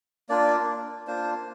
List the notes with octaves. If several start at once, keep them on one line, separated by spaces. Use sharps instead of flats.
A#3 D4 F4 D5
A#3 D4 F4 C5